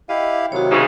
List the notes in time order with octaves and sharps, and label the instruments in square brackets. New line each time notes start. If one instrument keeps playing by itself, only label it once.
[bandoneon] E4 G4 F5 [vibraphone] D#5
[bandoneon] C3 D#3 F#3 [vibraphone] F#4 C#5
[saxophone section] G#2 C#3